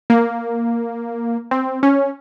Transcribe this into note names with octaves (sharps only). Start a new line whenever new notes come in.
A#3
C4
C#4